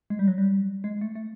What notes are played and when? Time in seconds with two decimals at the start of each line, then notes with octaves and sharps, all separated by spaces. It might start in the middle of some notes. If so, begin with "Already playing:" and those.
0.10 G#3
0.19 G3
0.28 F#3
0.38 G3
0.84 G#3
1.01 A3
1.15 A3